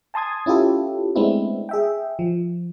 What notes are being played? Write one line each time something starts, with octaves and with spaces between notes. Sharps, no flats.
G#5 A5 C6 D#6 G#6
C#4 E4 F4 G4 A4
G#3 A3 B3 C4 D4 E4
G#4 E5 G5
F3